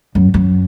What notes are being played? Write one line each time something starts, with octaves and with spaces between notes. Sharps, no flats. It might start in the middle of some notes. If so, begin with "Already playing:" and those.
F#2
F#2